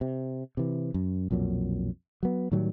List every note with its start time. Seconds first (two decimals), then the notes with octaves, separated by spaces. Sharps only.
0.01 C3
0.57 C3 E3
0.94 F#2
1.31 B1 F2 A#2 F#3
2.23 F#3 B3
2.52 A2 D#3 F#3 G3